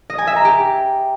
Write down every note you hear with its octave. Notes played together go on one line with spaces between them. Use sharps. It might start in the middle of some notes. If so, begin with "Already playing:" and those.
D#5
G#5
E5
A#5
G4